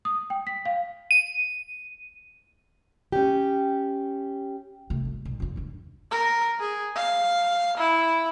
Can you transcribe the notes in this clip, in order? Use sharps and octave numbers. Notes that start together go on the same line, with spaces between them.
D#6
G5
B6
F5
D#7
C#4 G4
C3 A3
G#1
B1
F1 F2
G#2 D3
A#4
G#4
F5
E4